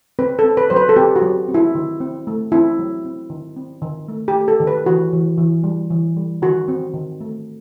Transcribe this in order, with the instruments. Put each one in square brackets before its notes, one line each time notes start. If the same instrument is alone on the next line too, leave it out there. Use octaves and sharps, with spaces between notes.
[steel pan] C4 B4
A4
C4
B4
F#3 C5
B4
A4
C4 G4
F#4
F#3
C4
E4
D#3
C4
A3
C4 E4
F#3
C4
D#3
C4
D#3
A3
G4
A3
A4
D#3
B4
E3 F#4
E3
E3
G3
E3
G3
D#3 F#4
C4
D#3
A3